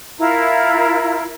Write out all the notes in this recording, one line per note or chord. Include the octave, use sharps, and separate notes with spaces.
E4 F4 A#4 A#5